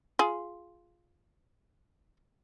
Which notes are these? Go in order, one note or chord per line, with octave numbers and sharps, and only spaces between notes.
F4 G#4